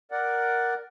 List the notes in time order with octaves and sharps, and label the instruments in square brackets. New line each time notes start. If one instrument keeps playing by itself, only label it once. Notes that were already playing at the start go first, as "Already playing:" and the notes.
[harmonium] A#4 D5 F#5